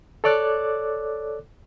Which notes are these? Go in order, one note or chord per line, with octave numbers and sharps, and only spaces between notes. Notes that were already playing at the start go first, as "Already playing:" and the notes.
A4 C#5 D5 D6 F#6